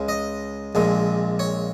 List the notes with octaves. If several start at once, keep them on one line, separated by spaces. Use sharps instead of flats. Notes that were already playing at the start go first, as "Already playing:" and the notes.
Already playing: C#2 C#3 G#3
D#5
A#1 A#2 G#3
C#5